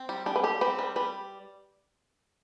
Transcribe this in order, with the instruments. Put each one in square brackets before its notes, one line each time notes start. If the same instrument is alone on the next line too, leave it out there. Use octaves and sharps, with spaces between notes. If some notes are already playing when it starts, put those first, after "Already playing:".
Already playing: [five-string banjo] C4
G3
[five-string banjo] G3 [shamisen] D4
[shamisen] B4
[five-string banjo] G4 [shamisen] A4
[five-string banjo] C4 [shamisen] B4
[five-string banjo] G3 [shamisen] B4
[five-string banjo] G3 [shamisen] B4